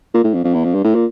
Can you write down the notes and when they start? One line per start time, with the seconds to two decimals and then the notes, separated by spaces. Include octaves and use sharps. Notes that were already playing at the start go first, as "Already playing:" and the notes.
0.14 A#2
0.24 A2
0.34 F2
0.44 F2
0.54 E2
0.64 F2
0.74 G2
0.84 A2
0.95 A#2